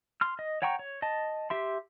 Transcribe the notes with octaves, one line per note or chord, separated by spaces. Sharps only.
C6 F6
D#5
C#5 F#5 G5 A#5 C#6
C#5
D#5 A5
G4 E5 C6